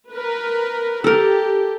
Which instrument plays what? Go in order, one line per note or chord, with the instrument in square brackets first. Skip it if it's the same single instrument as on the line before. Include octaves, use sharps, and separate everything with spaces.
[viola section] A#4 B4
[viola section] G4 [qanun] A4 A#4